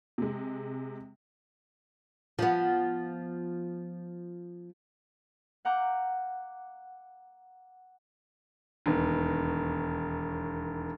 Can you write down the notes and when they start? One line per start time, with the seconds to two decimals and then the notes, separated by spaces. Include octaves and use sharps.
0.18 C3 G#3
2.39 F3 B3
5.65 F5 F#5 A#5 D6 G6
8.86 E1 D#2 B3